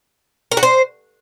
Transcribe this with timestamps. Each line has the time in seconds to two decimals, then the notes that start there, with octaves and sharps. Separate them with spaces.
0.52 A#4
0.57 F#4
0.63 C5